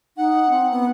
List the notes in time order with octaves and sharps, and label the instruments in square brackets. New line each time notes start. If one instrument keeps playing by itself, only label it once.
[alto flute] D#4 [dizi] F#5
[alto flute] C4
B3